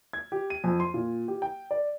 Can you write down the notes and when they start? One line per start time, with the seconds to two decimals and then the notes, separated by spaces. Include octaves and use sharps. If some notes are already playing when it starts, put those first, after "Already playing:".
0.13 G#6
0.32 G4
0.50 D#7
0.64 F2
0.80 C6
0.94 A#2
1.28 G4
1.42 G5
1.71 D5